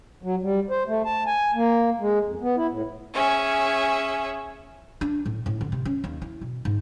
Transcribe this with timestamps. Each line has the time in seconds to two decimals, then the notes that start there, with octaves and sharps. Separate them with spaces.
0.23 F#3
0.42 G3
0.70 C5
0.87 A3
1.05 A5
1.27 G#5
1.54 A#3
2.00 G#3
2.25 F2
2.41 B3
2.56 E4
2.70 A2
3.14 C#4 G#4 E5
5.01 D4
5.26 A2
5.46 A2
5.61 D3
5.72 C3
5.85 C#4
6.04 D#2
6.22 E4
6.41 B2
6.65 G#2